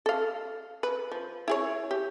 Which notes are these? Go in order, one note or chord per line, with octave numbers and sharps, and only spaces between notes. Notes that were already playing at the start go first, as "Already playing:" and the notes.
A4 F5
B4
F3
E4 G#4 C#5
G4